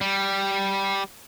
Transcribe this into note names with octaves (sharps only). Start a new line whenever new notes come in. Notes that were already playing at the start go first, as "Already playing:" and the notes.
G3